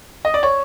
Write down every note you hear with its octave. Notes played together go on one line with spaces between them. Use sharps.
D#5
D5
C#5